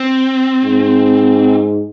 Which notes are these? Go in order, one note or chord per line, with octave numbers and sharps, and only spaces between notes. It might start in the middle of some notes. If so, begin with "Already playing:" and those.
Already playing: C4
G#2